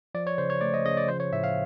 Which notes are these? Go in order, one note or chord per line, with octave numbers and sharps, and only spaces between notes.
F3 D5
C#5
C#3 C5
C#5
A3 D5
D#5
C#3 D#5
D5
F3 C5
C#5
A2 E5
F5